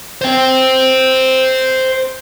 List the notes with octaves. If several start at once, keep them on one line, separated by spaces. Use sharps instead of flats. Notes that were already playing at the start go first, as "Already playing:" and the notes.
C5 G5